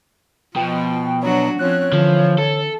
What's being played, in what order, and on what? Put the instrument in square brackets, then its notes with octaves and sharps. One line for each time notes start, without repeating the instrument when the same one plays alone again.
[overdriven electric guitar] B2 [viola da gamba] F3 [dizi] F4 [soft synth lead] G5
[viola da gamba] F#3 D4 F#4 [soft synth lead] C#5 [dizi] A#5
[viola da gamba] F3 C4 C#4 [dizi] C#5 [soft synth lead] F#6
[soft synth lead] D3 [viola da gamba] E3 [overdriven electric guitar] F3
[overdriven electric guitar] A4